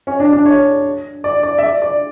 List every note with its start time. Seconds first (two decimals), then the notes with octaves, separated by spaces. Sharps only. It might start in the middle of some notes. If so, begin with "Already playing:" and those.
0.07 C#4
0.20 D4
0.33 D4
0.46 C#5
1.24 D5
1.43 D5
1.58 E5
1.63 D5
1.82 D5